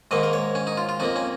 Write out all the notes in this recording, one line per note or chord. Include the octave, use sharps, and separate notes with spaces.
G#2 D#3 A#3 D#5
A#4
C#5
C#4
D#4
F4
F4
F2 F3 A#3 D#4
C#4